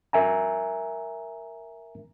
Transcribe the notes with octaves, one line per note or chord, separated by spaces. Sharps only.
A#4 E5 G#5 A#5